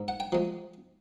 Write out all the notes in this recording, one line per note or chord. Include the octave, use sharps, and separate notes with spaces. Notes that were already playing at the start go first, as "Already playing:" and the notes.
Already playing: G#2
F#5
G5
F3 G#3